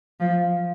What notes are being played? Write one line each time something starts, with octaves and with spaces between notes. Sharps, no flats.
F3